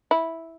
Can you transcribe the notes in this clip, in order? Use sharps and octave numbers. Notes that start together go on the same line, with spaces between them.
E4